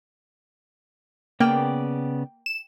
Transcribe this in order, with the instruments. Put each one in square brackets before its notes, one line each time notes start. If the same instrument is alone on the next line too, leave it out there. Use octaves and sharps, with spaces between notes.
[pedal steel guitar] C#3 B3 D5 [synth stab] A#3 [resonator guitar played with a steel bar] G5
[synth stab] E7